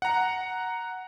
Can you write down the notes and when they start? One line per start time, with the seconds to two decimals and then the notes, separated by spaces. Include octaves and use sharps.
0.02 F#5 A#5